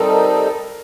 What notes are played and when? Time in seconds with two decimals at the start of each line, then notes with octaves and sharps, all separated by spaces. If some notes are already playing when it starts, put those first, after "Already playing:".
Already playing: G3 C4 D#4 A4 A#4